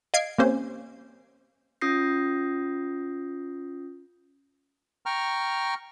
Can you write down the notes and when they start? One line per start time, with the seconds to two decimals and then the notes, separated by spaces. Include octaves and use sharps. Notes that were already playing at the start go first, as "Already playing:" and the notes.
0.14 D#5 F5 G#6 C7 D7
0.38 A#3 C4 C#4 G4 C5
1.81 C#4 F4 D#6 G6 A#6 C7
5.06 G5 A#5 C#6 F6